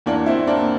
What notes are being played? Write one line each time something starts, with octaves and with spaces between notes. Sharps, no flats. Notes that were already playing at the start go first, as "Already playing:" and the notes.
E2 E3 A#3 D4
C4 E4
A#3 D4